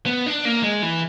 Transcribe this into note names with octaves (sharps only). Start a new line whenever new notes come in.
B3
D4
A#3
G#3
E3